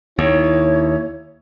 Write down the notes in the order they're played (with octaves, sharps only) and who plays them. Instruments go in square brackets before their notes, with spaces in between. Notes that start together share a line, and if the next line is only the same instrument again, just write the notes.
[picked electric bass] D#2 [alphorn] E4 [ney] C#5